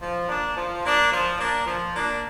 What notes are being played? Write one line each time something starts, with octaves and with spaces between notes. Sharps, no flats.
F3
A#3 D4
F3
A#3 D4
F3
A#3 D4
F3
A#3 D4